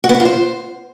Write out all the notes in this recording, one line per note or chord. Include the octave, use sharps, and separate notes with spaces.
F#4
B3
F#4
F4
C5